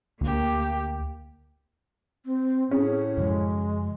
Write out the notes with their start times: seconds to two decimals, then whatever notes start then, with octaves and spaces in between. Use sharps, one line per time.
0.21 D2 A#3 G4
2.26 C4
2.71 A2 C#4 G#4
3.17 F#2 C#3 F3 G#3